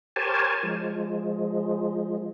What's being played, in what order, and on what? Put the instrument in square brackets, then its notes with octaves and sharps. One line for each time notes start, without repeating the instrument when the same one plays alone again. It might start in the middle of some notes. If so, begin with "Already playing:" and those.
[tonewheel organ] G4 A#4 C5 C#5 G#5 A5
F3 G#3